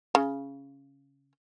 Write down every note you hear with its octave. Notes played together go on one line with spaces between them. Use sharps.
C#3